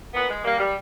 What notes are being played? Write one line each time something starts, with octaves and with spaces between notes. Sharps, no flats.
A#2 B3
G#3
G3 A#3
G3